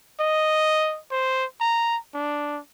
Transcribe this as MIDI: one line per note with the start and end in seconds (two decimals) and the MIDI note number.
0.20 0.99 75
1.11 1.45 72
1.60 1.97 82
2.14 2.60 62